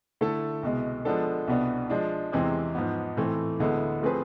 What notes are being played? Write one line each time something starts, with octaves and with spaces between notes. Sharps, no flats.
D3 A3 E4 A4
C2 B2 G#3
F3 G#3 B3 D4 A4
C2 B2 B3 D4
F3 G#3 D4
E2 C3 E3 G#3 C4
G#2 F3 B3
A2 E3 A3 C4
D2 D3 G#3 B3 E4
F3 A3 C4 G#4 B4